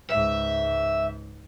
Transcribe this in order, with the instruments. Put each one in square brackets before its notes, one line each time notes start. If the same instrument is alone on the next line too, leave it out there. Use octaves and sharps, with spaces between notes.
[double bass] C#2 G#2 [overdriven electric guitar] E5